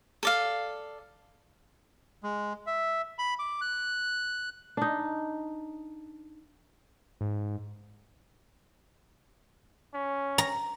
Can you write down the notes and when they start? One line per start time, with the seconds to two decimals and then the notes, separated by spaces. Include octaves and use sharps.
0.23 A4 D5 F5
2.23 G#3
2.67 E5
3.19 B5
3.39 D6
3.61 F#6
4.77 D4 D#4
7.21 G#2
9.94 C#4
10.38 A#5